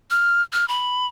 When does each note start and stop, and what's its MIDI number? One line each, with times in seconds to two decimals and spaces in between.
0.11 0.42 89
0.53 0.68 89
0.68 1.07 83